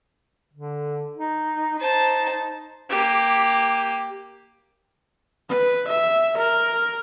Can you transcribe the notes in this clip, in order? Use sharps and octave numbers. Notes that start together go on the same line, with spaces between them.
D3
D#4
D#4 C5 A5
A#3 G4
B4
E5
A#4